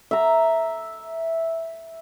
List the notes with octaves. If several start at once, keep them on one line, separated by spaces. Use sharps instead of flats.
E5 A#5